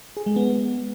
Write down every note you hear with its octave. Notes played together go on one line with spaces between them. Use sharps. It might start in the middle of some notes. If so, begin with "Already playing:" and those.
G#4
G#3
B3